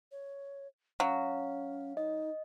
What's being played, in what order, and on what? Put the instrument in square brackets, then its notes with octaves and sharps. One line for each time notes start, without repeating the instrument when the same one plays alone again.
[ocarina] C#5
[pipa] F#3 [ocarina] C#4 [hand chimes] F5
[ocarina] D#4 [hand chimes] D#5